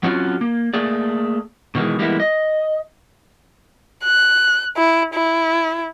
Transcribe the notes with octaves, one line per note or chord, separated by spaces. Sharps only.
F#3 C4 C#4 F4 F#4
A#3
A3 A#3 G#4 D5
B2 D#3 E3 G#3
E3 G3 G#3 A#3 B3 E4
D#5
F#6
E4
E4